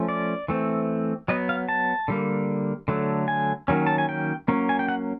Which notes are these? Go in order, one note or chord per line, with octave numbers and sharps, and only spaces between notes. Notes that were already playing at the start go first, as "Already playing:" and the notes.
Already playing: F3 A3 C#4
D5
E3 A3 C4
F#3 B3 D#5
F5
A5
D3 G3 A#3
D3 F#3 A3
G#5
D#3 F#3 A#3 C#4
A5
G#5
G5
F#3 A#3 C#4
G#5
G5
F#5